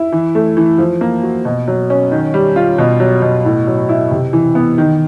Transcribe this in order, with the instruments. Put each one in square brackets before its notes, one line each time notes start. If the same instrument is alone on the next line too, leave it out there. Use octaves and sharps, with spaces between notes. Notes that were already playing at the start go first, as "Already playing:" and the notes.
Already playing: [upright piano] E4
E3
A3
E3
F3
A#3
F#4
B2
F#3
C#4
D#3
G3
F4
B2
F#3
B2
A2
F#3
E4
C3
E3
B3
D#3